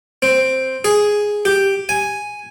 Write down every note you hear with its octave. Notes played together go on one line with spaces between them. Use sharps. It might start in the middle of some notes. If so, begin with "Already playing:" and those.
C4
G#4
G4
G#5